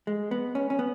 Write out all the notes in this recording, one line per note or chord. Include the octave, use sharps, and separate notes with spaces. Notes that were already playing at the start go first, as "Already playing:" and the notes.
G#3
B3
C#4
C#4
B3